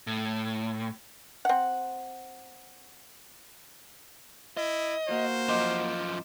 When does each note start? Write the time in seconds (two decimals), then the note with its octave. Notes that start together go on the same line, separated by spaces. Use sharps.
0.07 A2
1.45 C4 F#5
4.57 E4 D#5
5.08 A#3 F#4 C5
5.49 F#2 F3 D#5 C6 D6